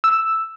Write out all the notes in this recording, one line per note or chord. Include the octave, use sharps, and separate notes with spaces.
E6